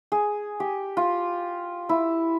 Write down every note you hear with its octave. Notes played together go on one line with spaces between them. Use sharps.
G#4
G4
F4
E4